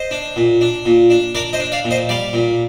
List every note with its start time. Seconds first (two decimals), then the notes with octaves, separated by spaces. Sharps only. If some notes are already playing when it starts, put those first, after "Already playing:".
Already playing: C5 D#5
0.11 D4
0.36 A#2
0.61 D4
0.85 A#2
1.10 D4
1.35 D4 A#4 D5
1.53 C5 D#5
1.59 D4
1.72 D5 F5
1.84 A#2
1.91 C5 D#5
2.09 G3 D5 F5
2.33 A#2